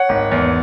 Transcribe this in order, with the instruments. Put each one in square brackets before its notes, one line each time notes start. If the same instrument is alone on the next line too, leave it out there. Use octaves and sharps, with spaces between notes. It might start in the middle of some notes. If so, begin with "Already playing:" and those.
Already playing: [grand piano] C#5 F#5
G#1
E2